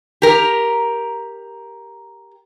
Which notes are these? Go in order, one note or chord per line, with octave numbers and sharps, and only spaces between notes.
G4 A#4